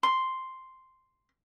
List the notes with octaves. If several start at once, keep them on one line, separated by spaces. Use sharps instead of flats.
C6